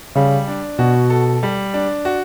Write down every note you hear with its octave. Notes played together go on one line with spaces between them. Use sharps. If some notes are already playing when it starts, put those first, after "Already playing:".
C#3 G3
D4
B2 F#4
A4
G3
D4
F#4